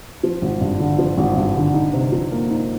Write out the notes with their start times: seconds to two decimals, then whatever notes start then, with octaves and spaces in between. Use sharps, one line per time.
0.23 F3
0.42 G#1
0.61 G2
0.80 D3
0.98 F3
1.17 G#1
1.36 G2
1.56 D3
1.74 D#4
1.93 C3
2.12 F3
2.31 A#3
2.50 D#4